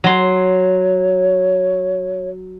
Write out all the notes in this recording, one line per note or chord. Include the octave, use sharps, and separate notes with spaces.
F#3 C6
C#5